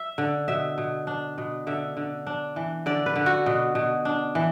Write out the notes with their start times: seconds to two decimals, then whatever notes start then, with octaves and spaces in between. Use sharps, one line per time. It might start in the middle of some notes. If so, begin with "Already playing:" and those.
Already playing: E5
0.18 D3
0.48 B2 E5
0.78 B2
1.07 D4
1.38 B2
1.67 D3 E5
1.97 D3
2.27 D4
2.56 E3
2.86 D3 D5
3.06 B4
3.16 D3
3.26 F#4
3.46 B2
3.75 B2
4.05 D4
4.35 E3